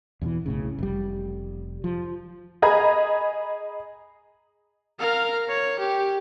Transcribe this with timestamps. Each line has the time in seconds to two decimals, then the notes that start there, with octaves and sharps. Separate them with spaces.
0.22 E2 B2 D#3 E3
0.46 B1 A2 C#3
0.79 F1 G3
1.84 F3
2.62 G#4 D#5 A#5 B5 G#6
4.99 A#4 F5
5.49 C#5
5.79 G4